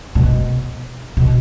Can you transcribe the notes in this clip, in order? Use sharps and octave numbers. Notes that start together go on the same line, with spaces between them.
B2
B2